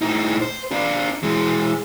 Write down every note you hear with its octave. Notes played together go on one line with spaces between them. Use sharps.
A2 D#4
C5
D4 F4
E3 G#3